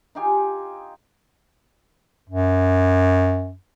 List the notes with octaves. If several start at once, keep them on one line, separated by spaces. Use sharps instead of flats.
D#4 F4 G4 G#5
F#2